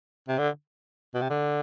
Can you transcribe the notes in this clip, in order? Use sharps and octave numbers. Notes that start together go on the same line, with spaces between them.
C3
D3
B2
C3
D3